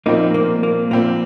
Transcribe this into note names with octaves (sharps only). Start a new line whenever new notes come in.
A#2 F3 A#3 C4 D#4
A#3
A#3
A#2 F3 A#3 C4